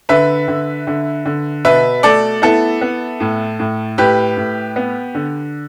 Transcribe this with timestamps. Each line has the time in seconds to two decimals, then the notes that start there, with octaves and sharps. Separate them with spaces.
0.09 D3 B4 E5
0.48 D3
0.87 D3
1.25 D3
1.65 B2 B4 E5
2.03 A3 A4 D5
2.42 B3 E4 A4
2.81 B3
3.20 A2
3.59 A2
3.98 A2 G4 B4
4.37 A2
4.76 B3
5.15 D3